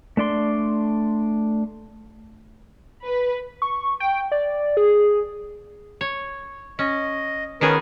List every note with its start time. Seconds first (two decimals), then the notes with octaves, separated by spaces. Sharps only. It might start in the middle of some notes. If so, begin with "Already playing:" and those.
0.17 A3 D4 D5 C6
3.03 B4
3.62 C#6
4.00 G5
4.32 D5
4.77 G#4
6.01 C#5
6.79 C#4 D#5
7.61 D#3 B3 C#4 G#4 A#4 B4